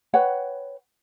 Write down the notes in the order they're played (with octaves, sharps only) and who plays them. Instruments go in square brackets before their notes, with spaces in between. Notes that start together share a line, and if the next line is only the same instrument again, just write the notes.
[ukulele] B4 C#5 F#5 G5